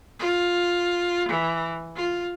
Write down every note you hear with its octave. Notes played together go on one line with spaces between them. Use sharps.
F4
E3
F4